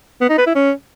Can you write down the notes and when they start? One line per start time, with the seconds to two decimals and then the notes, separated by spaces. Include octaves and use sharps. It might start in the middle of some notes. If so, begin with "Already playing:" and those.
0.21 B3
0.30 D#4
0.38 B4
0.47 E4
0.55 C#4